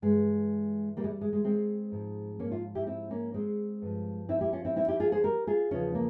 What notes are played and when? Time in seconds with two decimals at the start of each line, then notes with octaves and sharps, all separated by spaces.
0.02 G2 E3 G#3
0.97 G3 A#3
1.04 G#3
1.09 G3
1.21 G#3
1.33 G#3
1.44 G#3 C4
1.92 G#2 F3
2.40 A#3 C#4
2.51 C#4 F4
2.75 E4 G4
2.87 C4 E4
3.11 A#3 C#4
3.34 G#3 C4
3.82 G2 F3
4.29 C4 E4
4.41 E4 G4
4.53 C#4 F4
4.65 C4 E4
4.76 C4 E4
4.88 E4 G4
5.00 F4 G#4
5.12 G#4 C5
5.24 G4 A#4
5.47 F4 G#4
5.71 E2 C#3 F3 C#4 F4
5.95 A#3